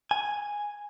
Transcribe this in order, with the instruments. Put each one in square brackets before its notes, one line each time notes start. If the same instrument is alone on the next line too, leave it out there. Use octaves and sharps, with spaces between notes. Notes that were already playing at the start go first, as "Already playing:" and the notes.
[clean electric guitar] G#5